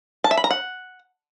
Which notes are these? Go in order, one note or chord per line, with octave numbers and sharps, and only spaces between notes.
A5
E5
B5
A#5
F#5